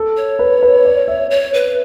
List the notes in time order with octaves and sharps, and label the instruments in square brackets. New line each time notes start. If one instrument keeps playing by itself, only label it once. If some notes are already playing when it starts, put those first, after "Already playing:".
Already playing: [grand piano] A4
[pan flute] C#5
[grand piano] B4
B4
D5
E5
[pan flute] C#5
B4